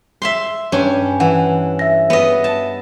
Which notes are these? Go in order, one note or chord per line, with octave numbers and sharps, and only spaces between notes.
E5 F5 C6
G2 C#4 G#5
E3 F#5
E5 A#6
B3 D#5
A5